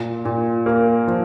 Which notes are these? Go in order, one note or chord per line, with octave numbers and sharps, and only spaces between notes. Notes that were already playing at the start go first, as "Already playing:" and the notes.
Already playing: A#2
A#2
A#3
F3